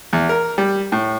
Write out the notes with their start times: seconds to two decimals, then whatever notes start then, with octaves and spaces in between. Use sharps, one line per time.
0.13 E2
0.29 A#4
0.58 G3
0.92 A2